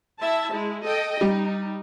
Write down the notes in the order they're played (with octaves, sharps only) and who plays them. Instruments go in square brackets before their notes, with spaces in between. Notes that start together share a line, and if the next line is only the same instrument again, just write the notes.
[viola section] E4 E5 A5
G#3 E4
A4 D#5 G5
[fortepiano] G3 [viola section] D#4